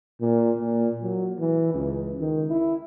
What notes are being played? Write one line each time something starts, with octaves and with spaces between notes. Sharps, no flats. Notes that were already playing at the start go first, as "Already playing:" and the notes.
A#2
A#2
F#3
E3
C#2
D#3
E4